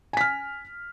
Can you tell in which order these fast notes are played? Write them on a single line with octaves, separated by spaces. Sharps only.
G#5 B6 F6